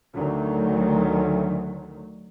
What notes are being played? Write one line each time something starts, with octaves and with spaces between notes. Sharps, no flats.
D2 D#3 F#3